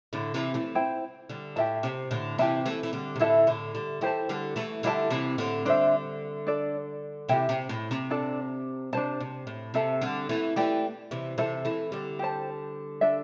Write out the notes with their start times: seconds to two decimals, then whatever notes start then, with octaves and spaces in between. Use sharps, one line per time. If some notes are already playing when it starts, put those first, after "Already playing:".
0.13 A2 D3
0.34 C3 E3
0.54 E3 A3
0.75 E4 C5 G5
1.29 D3 G3
1.56 A2 G4 E5 A5
1.83 C3
2.11 A2 D3
2.38 C3 E3 G4 E5 A5
2.66 E3 A3
2.83 E3
2.93 D3 G3
3.16 C3
3.20 A2 D3 E4 A4 E5 A5
3.47 A2 D3
3.75 D3 G3
4.01 E3 A3 G4 C5 A5
4.29 D3 G3
4.56 E3 A3
4.83 D3 G3 E4 G4 E5 A5
5.10 C3 E3
5.38 A2 D3
5.65 D3 G3 D4 C5 E5
6.47 D4 A4 D5
7.29 C3 E3 G4 E5 G5
7.49 C3
7.69 A2
7.91 C3
8.10 D4 A4 D5 A5
8.93 C3 D4 C5 A5
9.20 C3
9.47 A2
9.74 C3 A4 E5 A5
10.01 D3 G3
10.29 E3 A3
10.56 E3 A3 G4 D5 G5
11.11 C3 E3
11.38 C3 E3 A4 C5 E5
11.65 E3 A3
11.92 D3 G3
12.19 G4 C5 A5
13.01 D4 A4 E5